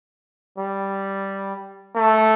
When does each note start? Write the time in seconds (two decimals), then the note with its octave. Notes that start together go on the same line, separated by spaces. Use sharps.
0.58 G3
1.96 A3